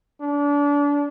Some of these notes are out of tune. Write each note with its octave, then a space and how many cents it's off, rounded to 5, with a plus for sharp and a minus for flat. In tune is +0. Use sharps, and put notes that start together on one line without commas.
D4 -30